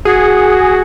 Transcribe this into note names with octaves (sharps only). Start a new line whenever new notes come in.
F#4 G#4